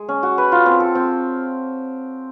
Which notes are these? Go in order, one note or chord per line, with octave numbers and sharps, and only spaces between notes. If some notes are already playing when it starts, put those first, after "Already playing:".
Already playing: G#3
C#4
F#4
B4
F4
C4
A4
C4